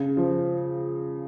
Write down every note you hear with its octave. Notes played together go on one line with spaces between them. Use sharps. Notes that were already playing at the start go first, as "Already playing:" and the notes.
Already playing: C#3
F3